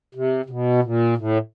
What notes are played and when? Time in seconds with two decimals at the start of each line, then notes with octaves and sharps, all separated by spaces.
0.15 C3
0.46 C3
0.50 B2
0.84 A#2
1.18 A2